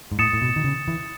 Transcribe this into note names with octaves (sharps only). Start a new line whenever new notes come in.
G#2
A2 D#6 A6 C#7 E7
A2
B2
D#3
C#3
E3